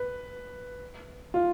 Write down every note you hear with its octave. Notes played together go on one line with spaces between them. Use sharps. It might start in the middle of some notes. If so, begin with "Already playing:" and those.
Already playing: B4
F4